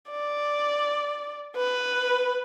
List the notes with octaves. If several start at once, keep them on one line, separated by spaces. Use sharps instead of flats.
D5
B4